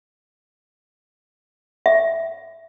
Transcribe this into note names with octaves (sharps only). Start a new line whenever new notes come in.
E5